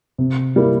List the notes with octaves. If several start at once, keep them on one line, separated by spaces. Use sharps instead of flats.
C3
G3 A#3 E4